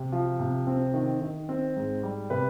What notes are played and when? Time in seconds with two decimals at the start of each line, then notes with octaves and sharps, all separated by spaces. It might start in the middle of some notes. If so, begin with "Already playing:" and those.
Already playing: C3
0.12 F3
0.40 C3
0.67 C4
0.94 D#3
1.21 D#3
1.49 C4
1.76 G#2
2.03 G3
2.30 C3 B4